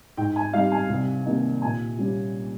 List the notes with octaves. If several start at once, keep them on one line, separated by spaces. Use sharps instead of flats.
G#2 G5
G#5
G3 C4 D#4 F5
G#5
C2
C3 D#3 A#3 D#4
A#2 G#5
G3 C#4